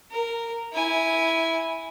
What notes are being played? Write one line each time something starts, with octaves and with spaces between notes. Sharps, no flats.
A#4
E4 G#5